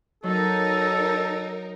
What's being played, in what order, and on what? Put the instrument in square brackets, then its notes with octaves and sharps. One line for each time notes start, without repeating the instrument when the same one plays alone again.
[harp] F#3 [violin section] D#4 A#4 [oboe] A4